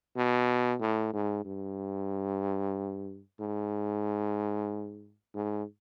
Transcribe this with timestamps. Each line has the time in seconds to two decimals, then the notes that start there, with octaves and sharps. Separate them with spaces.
0.17 B2
0.80 A2
1.13 G#2
1.45 G2
3.40 G#2
5.34 G#2